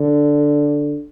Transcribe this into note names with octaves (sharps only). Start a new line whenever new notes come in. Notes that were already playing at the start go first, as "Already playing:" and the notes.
Already playing: D3